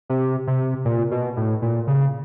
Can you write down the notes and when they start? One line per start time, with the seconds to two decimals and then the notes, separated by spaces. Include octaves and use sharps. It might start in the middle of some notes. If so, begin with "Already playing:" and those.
0.09 C3
0.47 C3
0.85 A#2
1.11 B2
1.37 A2
1.62 A#2
1.87 C#3